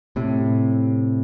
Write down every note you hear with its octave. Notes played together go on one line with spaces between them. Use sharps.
A2 C3